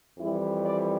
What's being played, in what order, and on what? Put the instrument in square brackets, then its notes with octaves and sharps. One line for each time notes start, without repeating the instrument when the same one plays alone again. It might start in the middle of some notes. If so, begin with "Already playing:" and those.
[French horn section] F2 E3 G3 E4
D5